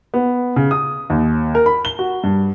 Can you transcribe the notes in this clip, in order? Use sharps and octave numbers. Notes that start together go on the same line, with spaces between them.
B3
C#3
D#6
D#2
A#4
B5
G7
F#4
G2